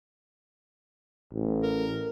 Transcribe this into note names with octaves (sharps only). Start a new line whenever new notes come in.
A1
A#4